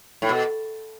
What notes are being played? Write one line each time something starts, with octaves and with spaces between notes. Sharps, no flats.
A2
B2